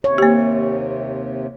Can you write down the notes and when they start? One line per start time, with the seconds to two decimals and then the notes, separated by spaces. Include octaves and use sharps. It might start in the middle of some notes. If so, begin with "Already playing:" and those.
0.04 D#2 C3 C#5
0.18 A#3 G4